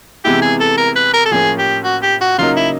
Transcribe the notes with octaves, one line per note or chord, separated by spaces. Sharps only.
C3 E3 G#3 B3 E4 G4
G#4
A4
A#4
B4
A#4
A4
A2 F3 A#3 C#4 G#4
G4
F#4
G4
F#4
C#3 F#3 A#3 D#4 F4
E4